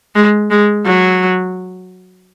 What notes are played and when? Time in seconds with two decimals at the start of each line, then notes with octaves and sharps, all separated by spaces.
0.15 G#3
0.51 G#3
0.85 F#3